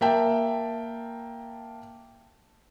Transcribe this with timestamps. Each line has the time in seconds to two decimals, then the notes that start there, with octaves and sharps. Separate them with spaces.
0.01 A#3 E5 G5 A5